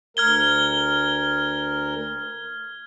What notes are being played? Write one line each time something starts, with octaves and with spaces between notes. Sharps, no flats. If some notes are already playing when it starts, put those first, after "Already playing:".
D2 A#4 F6 G#6 G7